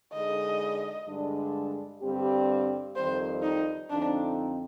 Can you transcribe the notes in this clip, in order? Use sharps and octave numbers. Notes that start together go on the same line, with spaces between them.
D3 G#3 D#4 G#4 D#5
G2 D3 G#3 D4
G2 D3 G3 C4 G4
F2 D#3 G3 C4 C5
D#4
F2 D3 F3 C4 D4 D#4